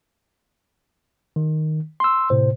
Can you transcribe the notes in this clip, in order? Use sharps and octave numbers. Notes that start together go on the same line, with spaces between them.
D#3
C6 E6
A2 C3 C5